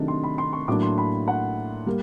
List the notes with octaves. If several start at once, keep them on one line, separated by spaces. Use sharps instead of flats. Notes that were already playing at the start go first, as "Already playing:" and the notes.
Already playing: C3 D#3 F#3 A3 D4
C6
B5
C6
C#6
A2 F#3 A#3 D4 D6
C6
B5
F#5
G3 A#3